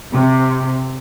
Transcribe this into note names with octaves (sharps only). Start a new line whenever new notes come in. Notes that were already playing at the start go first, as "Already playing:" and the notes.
C3